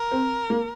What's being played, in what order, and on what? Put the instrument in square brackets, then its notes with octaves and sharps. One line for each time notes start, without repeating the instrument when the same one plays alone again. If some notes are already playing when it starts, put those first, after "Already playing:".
Already playing: [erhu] A#4
[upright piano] C4
A#3